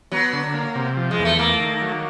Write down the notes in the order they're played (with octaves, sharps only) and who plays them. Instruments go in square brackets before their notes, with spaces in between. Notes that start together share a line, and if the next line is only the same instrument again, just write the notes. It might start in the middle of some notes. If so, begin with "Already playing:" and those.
[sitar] F#3 [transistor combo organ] B3
[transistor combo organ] D3
A#3
C3
F3
[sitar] G#3
[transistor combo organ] E2
[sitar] A3
[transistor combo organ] A3 [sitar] A#3
[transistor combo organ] D#3
F#3